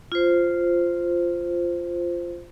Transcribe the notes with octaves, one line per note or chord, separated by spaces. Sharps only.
F4 C5